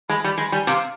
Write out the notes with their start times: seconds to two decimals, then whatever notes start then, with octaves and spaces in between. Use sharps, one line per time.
0.09 G#3 B5
0.24 G3 B5
0.38 G#3 B5
0.52 G3 G#5
0.67 C3 F5